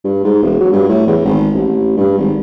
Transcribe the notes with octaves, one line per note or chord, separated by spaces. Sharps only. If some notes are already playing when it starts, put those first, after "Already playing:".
G2
G#2
E1
F#3
G2
A2
E2
G#1
A1
G2
G#1